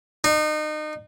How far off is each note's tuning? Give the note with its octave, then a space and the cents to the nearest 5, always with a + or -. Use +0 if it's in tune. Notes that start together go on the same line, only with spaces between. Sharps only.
D#4 -30